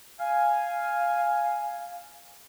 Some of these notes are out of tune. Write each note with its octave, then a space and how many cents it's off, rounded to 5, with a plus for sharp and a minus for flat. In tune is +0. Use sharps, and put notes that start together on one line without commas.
F5 +0 G#5 +0